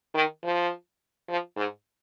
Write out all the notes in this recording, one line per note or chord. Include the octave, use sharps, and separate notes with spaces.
D#3
F3
F3
G#2